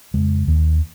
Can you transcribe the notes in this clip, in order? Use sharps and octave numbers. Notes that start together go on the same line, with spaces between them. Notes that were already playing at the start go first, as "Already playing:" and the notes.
F2 C#3 G#3
D#2 D#3 A#3